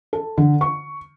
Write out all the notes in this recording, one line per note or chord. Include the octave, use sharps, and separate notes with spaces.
A4
D3
C#6